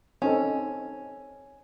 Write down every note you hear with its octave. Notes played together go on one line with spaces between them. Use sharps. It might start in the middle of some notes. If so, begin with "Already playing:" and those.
C4 C#4 D#4 A4